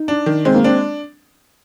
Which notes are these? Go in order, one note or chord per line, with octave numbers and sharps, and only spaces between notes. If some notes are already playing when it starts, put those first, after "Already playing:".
Already playing: D#4
D4
D#3
G#3 C4
A#3
C4 D4